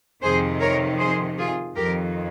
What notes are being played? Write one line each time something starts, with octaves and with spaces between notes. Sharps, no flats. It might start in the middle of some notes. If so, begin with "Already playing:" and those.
F2 C3 D#3 G#4 C5
A#4 C#5
G#4 C5
F4 G#4
F2 D#3 G4 A#4